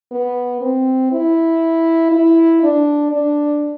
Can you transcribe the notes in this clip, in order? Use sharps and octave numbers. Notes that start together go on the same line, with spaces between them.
B3
C4
E4
E4
D4
D4